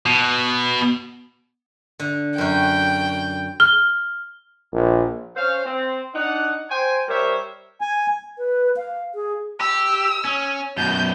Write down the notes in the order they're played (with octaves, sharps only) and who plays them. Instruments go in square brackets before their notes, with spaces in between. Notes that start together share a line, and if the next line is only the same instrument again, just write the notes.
[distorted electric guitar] B2
[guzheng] D3
[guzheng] F#2 F#4 [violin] G5
[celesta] F6 G7
[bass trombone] A#1
[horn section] C#4 C5 F5
C4
D4 D#4 F#5
C5 G5 G#5
G3 G4 A#4 C5 C#5 E5
[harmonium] G#5
[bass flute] B4
F5
G#4
[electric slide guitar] G4 [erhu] E6
[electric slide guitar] C#4
[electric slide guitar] F#2 B2 [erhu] G6